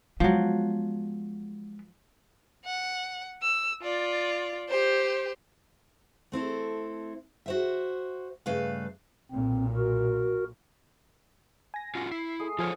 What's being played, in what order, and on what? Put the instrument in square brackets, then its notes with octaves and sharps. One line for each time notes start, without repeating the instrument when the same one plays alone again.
[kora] F3 F#3 [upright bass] G#3 B3
[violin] F#5
E6
F4 D5
G4 C5
[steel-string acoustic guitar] A3 C4 E4 A4
F#4 C5 E5
G2 C#3 A3 B4 F5
[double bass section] B1 A#2 [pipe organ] C4
[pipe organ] F#4 A#4
[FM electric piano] G#5 A#6
[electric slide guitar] C#4 F4 F#4
[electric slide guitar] E4 [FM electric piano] C7
[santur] G#3 A3 D#6
[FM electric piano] F3 G#5 F6 [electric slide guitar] F4 C5 C#5 [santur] A4